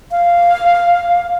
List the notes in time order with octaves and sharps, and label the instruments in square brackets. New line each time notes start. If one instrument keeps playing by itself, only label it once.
[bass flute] F5